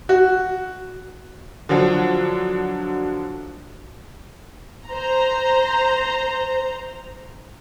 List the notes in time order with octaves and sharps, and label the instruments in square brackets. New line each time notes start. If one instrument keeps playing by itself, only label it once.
[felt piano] F#4
[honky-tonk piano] D3 F3 F#3 D4
[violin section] C5 A#5